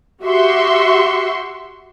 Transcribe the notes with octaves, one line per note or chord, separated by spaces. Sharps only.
F#4 G4 E5 C6 C#6